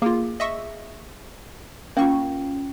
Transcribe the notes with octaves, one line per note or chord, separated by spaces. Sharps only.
A#3 F4 G#4
D#5 E5 C#6
A#3 C#4 F4 C#6